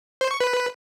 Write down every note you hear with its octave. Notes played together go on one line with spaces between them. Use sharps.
C5
C#6
B4